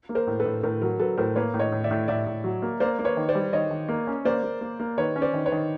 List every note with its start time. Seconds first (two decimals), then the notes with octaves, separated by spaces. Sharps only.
0.09 A#3
0.15 A#4 C5
0.27 A2
0.40 A4 B4
0.45 A2
0.63 A2 A#4
0.82 F#3 A#4
0.99 F#3 A4 B4
1.17 A2 A#4 C5
1.36 A#3 B4 C#5
1.54 A2
1.59 C#5 D#5
1.72 A2
1.84 D5 E5
1.91 A2
2.08 A2 D5 E5
2.27 A2
2.44 F#3
2.62 A#3
2.80 A#3 C5 D5
2.99 A#3
3.04 B4 C#5
3.17 D#3
3.29 C5 D5
3.35 G3
3.53 D#3 C#5 D#5
3.71 D#3
3.89 A#3
4.07 C#4
4.25 A#3 C5 D5
4.43 A#3
4.61 A#3
4.80 A#3
4.98 D#3 B4 C#5
5.16 C#4
5.22 C5 D5
5.34 D#3
5.46 B4 C#5
5.52 D#3